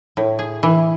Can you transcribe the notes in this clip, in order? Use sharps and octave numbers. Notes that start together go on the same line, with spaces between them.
A2
G#4
E3